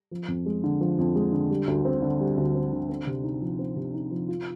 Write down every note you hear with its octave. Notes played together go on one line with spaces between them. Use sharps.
F3
F2
G#3
D3
F3
F2
G#3
D3
G3
D2
C4
D3
G3
D2
C4
D3
C4
C3
D#4
F3
C4
C3
D#4
F3
F4